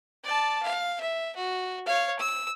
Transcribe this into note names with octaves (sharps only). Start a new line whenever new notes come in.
D5 A5
F5
E5
F#4
C#5 F5
E6